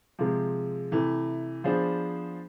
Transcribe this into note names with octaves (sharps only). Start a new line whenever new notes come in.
C3 F3 G#3
C3 E3 A3
F3 B3 D4 G#4 C5